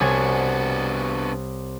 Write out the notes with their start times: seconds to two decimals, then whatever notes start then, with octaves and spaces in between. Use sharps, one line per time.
0.01 C2 B3 D4 F#4 C#5 G#5